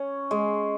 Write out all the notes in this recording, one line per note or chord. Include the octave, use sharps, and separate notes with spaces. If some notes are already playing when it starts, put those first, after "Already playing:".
Already playing: C#4
G#3